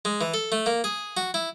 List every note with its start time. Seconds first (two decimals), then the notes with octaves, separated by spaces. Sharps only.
0.05 G#3
0.21 E3
0.34 A4
0.52 A3
0.66 A#3
0.84 G#4
1.17 F#4
1.34 E4